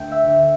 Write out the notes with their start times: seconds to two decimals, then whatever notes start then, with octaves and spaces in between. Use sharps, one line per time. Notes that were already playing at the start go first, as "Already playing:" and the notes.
Already playing: D2 A3 G5
0.11 E5
0.26 D2